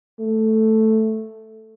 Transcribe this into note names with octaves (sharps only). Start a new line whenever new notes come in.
A3